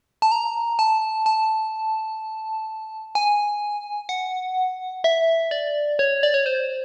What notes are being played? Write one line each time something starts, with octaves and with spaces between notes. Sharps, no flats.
A5
A#5
A5
A5
G#5
F#5
E5
D5
C#5
D5
C#5
C5